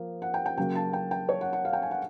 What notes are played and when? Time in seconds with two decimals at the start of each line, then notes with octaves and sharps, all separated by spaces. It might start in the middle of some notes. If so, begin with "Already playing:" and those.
Already playing: F3 A#3
0.22 F#5
0.34 G5
0.46 G5
0.57 C#3 F#3 A#3 G5
0.75 A5
0.93 G5
1.11 G5
1.29 C#5
1.41 F#5
1.53 F#5
1.65 F5
1.73 G5
1.82 G#5
1.91 F#5